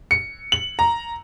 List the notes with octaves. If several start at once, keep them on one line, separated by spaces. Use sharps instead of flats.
C#7
F#7
A#5